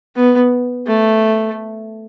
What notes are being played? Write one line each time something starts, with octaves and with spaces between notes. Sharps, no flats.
B3
A3